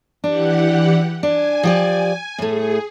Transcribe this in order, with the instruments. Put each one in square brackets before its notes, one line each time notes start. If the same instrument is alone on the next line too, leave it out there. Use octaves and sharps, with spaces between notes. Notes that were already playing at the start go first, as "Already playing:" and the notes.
[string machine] E3 G4 F#5 [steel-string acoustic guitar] D4
[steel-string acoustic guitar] D4 [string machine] G#5
[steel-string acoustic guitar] F3 G4 D5
[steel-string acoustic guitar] A2 A3 [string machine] G#4